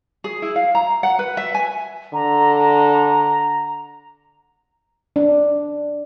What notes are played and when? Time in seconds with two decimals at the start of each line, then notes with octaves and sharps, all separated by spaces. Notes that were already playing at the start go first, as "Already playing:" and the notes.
0.24 G#4
0.42 E4
0.56 F5
0.75 A#5
1.03 F#5
1.19 B4
1.37 E5
1.54 G#5
2.13 D3 A#5
5.16 D4